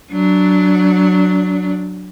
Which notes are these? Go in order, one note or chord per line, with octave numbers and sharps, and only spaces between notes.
F#3 D4